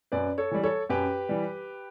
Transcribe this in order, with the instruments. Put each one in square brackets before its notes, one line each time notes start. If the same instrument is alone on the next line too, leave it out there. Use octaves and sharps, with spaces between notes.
[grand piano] F#2 B4 D5
A4 C#5
E3 G3
A4 C#5
F#2 G4 B4
E3 G3